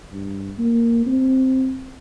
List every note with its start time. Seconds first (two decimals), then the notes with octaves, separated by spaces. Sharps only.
0.13 G2
0.58 A#3
1.07 C4